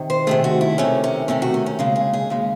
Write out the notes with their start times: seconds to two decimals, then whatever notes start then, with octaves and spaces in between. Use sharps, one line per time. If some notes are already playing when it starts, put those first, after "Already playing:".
Already playing: C3 D#3
0.10 C5
0.27 C3 D#3 A3 G#4
0.44 F#4
0.61 E4
0.78 C3 D#3 A3 C#4
1.04 C#4
1.28 C3 D#3 A3 C#4
1.42 F#4
1.54 C#4
1.66 C#4
1.79 D#2 C#3 G#3
1.96 G#4
2.13 G#4
2.30 D#2 C#3 G#3